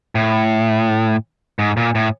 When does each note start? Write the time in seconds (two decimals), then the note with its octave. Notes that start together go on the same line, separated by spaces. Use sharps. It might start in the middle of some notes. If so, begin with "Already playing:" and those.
0.15 A2
1.59 G#2
1.77 A#2
1.95 A2